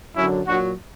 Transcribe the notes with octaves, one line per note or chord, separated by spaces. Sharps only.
F#2 D3 F#3 C#4 E4
A#2 F#3 D4 F#4